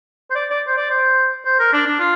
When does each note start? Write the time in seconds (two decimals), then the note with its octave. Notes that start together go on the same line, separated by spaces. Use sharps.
0.31 C5
0.35 D5
0.50 D5
0.67 C5
0.77 D5
0.90 C5
1.45 C5
1.59 A#4
1.73 D4
1.86 D4
2.00 F4